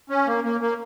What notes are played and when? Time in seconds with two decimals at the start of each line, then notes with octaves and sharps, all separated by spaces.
0.10 C#4
0.27 A#3
0.44 A#3
0.61 A#3